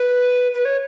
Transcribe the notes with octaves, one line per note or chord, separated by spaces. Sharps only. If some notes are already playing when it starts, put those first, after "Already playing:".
Already playing: B4
B4
C#5